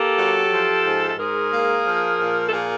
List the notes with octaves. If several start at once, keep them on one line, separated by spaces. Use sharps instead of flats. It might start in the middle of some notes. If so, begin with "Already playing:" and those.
Already playing: A#3 G4 A4
F#3
F3
G#2
A4
G#2 G#4 A#4
A#3
F3
A#2
A4
A#2 G#4 A#4